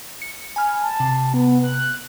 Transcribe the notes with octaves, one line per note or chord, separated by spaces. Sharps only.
C#7
G#5 B5 F6
A5
C3
B3
F#6